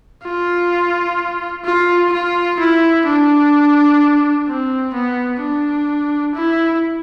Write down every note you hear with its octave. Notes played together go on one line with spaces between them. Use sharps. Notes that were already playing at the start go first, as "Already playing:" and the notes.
F4
F4
F4
E4
D4
C4
B3
D4
E4